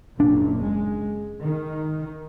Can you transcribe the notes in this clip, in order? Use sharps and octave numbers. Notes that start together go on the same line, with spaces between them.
F#1 A#2 D4
G#3
D#3